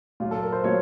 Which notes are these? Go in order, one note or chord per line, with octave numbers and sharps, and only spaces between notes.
A#2 F#3 A#3 F4
A4
A#4
C5
A#2 F#3 A#3 C#5